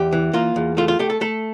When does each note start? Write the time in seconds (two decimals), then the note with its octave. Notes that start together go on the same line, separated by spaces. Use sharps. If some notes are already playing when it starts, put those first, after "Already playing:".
Already playing: E2 G4
0.13 E3
0.33 A#3 F4
0.56 E2
0.77 A3 F4
0.88 F4
0.99 A3 G4
1.10 A4
1.21 A3 A4